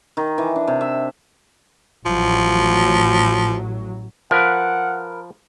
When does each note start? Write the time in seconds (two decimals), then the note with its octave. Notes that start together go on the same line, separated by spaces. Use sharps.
0.17 D#3
0.38 E3
0.56 D4
0.67 C3
0.81 E5
2.05 A1 A2 F3 F#3
4.31 F3 A#4 B4 F#5